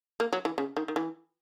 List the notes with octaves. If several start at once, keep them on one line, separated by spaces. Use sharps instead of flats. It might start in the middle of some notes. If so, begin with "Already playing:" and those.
A#3
F#3
E3
C#3
D#3
D#3
E3